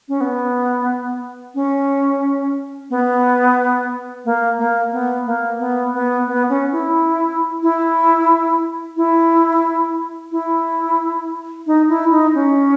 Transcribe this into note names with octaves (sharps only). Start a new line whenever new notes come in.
C#4
B3
C#4
B3
A#3
A#3
B3
A#3
B3
B3
B3
C#4
E4
E4
E4
E4
D#4
E4
D#4
C#4